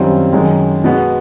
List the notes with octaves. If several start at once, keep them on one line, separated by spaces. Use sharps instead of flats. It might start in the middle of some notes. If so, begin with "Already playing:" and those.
Already playing: F#2 D#3 G3 C4 F4
F#2 D#3 G#3
B2 G#3 B3